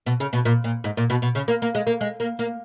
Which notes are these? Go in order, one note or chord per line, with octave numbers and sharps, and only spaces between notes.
B2
C#3
B2
A#2
A#2
G#2
A#2
B2
B2
C#3
A#3
A#3
G#3
A#3
G#3
A#3
A#3